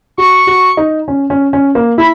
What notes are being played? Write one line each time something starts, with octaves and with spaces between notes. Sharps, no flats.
F#4 C#6
F#4
D#4
C#4
C#4
C#4
A#3
E4 B5